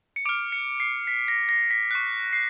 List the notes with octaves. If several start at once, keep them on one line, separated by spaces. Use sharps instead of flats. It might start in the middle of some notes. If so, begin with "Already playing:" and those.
C#7
D6 F6 D7
C#7
C7
B6
A#6
A#6
B6
C#6 F#6 B6
C7